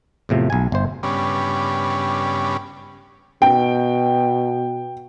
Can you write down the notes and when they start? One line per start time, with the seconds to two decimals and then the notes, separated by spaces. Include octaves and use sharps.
0.29 E2 A2 C3 F3
0.50 B1 G#5
0.72 G1 C5
1.03 G2 C#3 G3 B3 C#4 D4
3.42 B2 G5